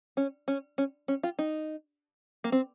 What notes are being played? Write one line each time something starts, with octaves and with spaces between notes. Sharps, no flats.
C#4
C#4
C#4
C#4
F4
D#4
A#3
C4